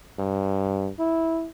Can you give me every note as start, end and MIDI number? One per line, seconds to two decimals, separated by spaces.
0.19 0.90 43
0.99 1.49 64